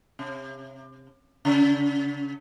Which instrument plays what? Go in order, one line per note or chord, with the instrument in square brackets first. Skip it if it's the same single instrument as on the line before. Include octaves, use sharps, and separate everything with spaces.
[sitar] C3
C#3